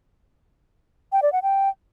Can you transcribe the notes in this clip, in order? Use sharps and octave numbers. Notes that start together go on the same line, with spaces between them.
G5
D5
F#5
G5